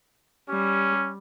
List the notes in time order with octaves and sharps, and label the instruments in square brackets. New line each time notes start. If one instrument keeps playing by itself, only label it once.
[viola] G3 [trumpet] C#4